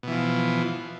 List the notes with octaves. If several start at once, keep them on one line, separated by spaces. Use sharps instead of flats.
B2 E3 F3